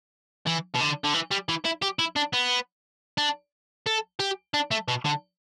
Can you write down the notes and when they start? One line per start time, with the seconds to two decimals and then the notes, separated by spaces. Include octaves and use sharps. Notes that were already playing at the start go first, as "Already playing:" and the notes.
0.46 E3
0.74 B2
0.80 D3
1.04 D3
1.14 E3
1.31 G3
1.49 E3
1.65 E4
1.82 G4
1.99 E4
2.16 D4
2.33 B3
3.18 D4
3.86 A4
4.19 G4
4.54 D4
4.71 A3
4.88 B2
5.05 D3